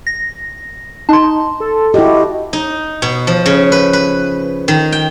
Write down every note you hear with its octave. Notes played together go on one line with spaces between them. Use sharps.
A#6
D#4 A5 C6
A4
E4 F#4 G4 D#5
D#4
B2
F3
C#3
B4
B4
D#3
G5